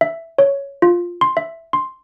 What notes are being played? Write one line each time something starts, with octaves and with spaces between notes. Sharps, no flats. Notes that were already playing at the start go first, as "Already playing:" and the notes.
E5
C#5
F4
C6
E5
C6